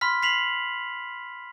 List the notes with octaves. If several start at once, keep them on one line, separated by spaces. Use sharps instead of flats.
B5 C6 F6 B6
B6 C7 F7 F#7